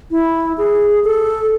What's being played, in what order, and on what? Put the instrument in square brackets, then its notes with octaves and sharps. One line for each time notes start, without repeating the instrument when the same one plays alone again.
[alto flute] E4
G#4
A4